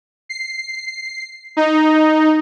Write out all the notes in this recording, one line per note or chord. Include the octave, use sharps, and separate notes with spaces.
C7
D#4